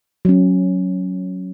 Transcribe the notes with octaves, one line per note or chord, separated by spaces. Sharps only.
F#3 C#4